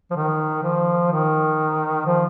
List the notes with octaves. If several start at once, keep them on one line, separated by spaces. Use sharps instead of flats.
F3
D#3
F3
D#3
F3